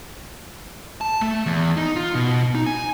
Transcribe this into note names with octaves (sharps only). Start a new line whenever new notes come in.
A5
A3
E2
D#4
F4
B2
D#4
G#5